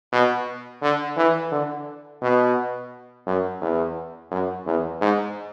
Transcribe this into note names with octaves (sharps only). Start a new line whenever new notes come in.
B2
D3
E3
D3
B2
F#2
E2
F#2
E2
G#2